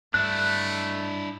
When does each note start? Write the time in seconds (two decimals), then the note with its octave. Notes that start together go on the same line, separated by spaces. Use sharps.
0.14 G2 A3 D4 E4 F#6